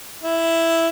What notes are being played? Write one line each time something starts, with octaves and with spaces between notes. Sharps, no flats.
E4